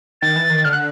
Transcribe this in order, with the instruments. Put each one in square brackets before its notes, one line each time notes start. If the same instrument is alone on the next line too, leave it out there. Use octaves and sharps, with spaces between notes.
[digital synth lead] D#3 [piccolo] A6
[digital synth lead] E3
D#3
[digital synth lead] D3 [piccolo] F6
[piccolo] F#6